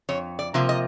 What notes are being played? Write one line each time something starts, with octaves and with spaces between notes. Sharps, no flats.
F2 C#5
D5
C3 F3 A#3
D#5